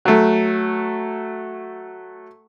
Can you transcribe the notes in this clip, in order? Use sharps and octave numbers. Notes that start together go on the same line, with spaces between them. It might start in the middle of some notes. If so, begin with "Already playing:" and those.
F#3 A3